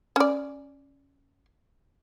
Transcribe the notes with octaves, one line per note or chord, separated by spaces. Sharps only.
C#4 D5